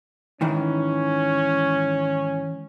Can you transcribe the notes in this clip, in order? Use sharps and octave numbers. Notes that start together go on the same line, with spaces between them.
G#2 D#3 E3 C#4